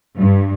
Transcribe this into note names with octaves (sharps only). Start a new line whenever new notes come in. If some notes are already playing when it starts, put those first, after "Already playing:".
G2